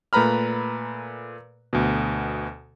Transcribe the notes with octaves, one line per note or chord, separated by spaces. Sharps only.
A#2 A3 B4 A#5 B5 F6
D2 B2